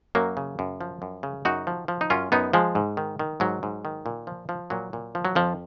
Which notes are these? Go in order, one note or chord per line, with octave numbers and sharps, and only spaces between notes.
F#2 F#3 A#3
C#3
F#2
F3
F#2
C#3
F#2 D#4 F#4
F3
F3
D#4
F#2 C#4 F4
F#2 B3 D#4
F3 G#3
G#2
D#3
D#3
G#2 F#3
G#2
D#3
A#2
F3
F3
A#2 F#3
A#2
F3
F#3
F2 F3